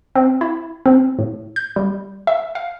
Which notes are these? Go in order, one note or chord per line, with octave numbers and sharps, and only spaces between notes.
C4
E4
C4
A2
G6
G3
E5
F5